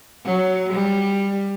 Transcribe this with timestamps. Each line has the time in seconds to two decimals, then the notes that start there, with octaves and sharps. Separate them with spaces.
0.24 F#3
0.74 G3